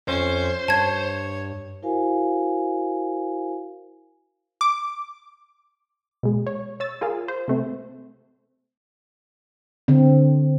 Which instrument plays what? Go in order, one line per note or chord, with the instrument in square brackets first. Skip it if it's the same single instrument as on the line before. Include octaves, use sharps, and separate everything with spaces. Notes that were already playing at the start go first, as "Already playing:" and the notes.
[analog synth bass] F2 [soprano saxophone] C#4 [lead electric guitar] C5
[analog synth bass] G2 [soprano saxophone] C#5 [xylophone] A5 G#6
[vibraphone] E4 F#4 A#4 C5 F5 G#5
[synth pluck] D6
B2 G#3
C#5
C#5 E6 A6
F4 G#4 A#4 F5
C5
C3 A3 C4
[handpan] D3 C4